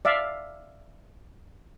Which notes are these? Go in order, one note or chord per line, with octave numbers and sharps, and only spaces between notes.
D5 E5 F5